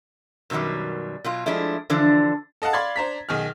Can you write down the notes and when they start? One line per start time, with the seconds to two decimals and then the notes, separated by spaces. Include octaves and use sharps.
0.50 F#2 B2 D#3 F#3 G3
1.24 B2 F#3 F4
1.46 F3 G#3 A3 D4 E4
1.90 D3 E3 F3 D4 D5
2.62 A4 D#5 F5 F#5 A5
2.73 D5 F5 B5 C6 G#6 A6
2.96 D4 C5 A#5 B6
3.29 B1 D#3 G#4 F6